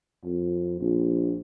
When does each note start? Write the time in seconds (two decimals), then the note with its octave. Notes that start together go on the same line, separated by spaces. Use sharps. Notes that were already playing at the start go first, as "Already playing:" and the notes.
0.24 F2
0.80 A#1